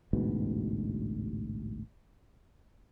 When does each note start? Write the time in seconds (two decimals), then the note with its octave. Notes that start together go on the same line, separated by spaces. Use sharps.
0.13 A1 D2 G#2 B2